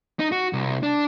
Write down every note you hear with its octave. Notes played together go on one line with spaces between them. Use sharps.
D#4
F#4
C2
D4